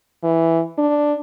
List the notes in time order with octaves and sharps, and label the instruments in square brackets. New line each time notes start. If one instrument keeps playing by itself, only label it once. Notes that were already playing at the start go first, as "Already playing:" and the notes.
[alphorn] E3
D4